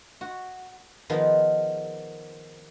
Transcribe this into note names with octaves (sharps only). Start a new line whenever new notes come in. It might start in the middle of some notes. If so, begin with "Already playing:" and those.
F#4
D#3 F3 B3 G#4 A#4 B4